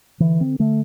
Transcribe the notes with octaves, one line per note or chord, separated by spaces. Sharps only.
D3 E3
C4
D3 A3